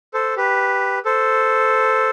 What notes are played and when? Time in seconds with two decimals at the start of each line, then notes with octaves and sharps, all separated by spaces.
0.14 A4 C5
0.37 G4 B4
1.05 A4 C5